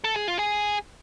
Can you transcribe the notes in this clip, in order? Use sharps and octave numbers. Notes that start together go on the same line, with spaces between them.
A4
G#4
F4
G#4